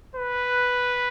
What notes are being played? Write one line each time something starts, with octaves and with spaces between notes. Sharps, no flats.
B4